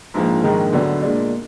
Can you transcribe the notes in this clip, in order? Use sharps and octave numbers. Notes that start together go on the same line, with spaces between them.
A#1 G#2 F3 A#3
A#1 G#2 D#3 G#3
D2 D3 F#3 B3 D4
A#2 G#3 D4